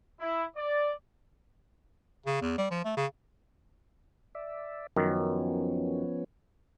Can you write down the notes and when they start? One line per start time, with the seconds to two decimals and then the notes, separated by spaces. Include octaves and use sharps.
0.20 E4
0.56 D5
2.26 C#3
2.41 E2
2.58 G3
2.71 F3
2.85 A3
2.97 C#3
4.35 D5 E5
4.96 F#2 D#3 F3 B3 C#4